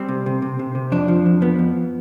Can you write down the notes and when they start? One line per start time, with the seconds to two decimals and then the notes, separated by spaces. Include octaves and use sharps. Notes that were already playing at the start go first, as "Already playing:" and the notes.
Already playing: G3 C4
0.08 C3
0.26 C3
0.42 C3
0.59 C3
0.75 C3
0.92 F2 D4
1.08 F3
1.26 F2
1.41 F3 B3
1.59 F2